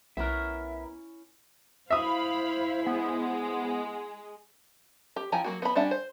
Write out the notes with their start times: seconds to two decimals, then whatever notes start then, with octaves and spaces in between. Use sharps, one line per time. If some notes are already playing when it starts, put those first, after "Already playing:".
0.17 B1 B3 C#4 E4 A#4 E5
1.90 E4 C5 E5 F5 B5 D#6
2.87 G#3 B3
5.16 G4
5.32 F3 E4 G5 G#5 A#5
5.44 F#3 A#3 F#4
5.62 B3 B5
5.75 G3 C#4 D4 E5 F#5
5.91 C5